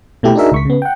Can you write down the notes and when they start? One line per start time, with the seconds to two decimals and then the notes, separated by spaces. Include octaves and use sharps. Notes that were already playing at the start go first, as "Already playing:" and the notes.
0.23 B2 A3 E4 G4
0.35 D4 D#4 F#4 G#4 A#4 E5
0.52 C#2 C#6 B6
0.65 C#3 B3
0.82 F#5 G5